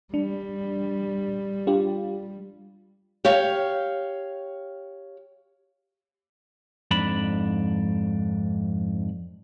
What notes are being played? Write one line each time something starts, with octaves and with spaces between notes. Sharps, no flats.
G3 D4
D4 F4 G4
G4 C#5 F5
F2 G#2 D4 B5